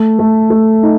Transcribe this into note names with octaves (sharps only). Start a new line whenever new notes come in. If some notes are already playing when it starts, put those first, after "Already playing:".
Already playing: A3
A3
A3
D#4